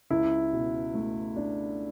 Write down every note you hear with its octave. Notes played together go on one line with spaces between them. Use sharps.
C#2 E4
B2
A3
D4